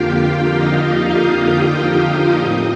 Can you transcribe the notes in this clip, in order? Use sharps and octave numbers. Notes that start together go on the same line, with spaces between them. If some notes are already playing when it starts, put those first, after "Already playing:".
Already playing: F2 D3 F3 A#3 F4 G4 F5 G5
D#4 D#5
F4 F5
G4 G5
A2 F3 C4 D#4 D#5